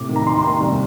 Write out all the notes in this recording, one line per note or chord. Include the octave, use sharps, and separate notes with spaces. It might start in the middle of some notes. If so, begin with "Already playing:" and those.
Already playing: A2 C3 D6
D#3
A#5
D#2 C6
C6
D#2 A#5
C2